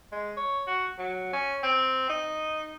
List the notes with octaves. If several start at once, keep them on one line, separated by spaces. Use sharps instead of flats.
G#3
C#5
F#4
F#3
C#4
C4
D#4